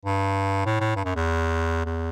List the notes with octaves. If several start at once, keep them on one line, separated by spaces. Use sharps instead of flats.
G2
A2
A2
G2
F#2
E2
E2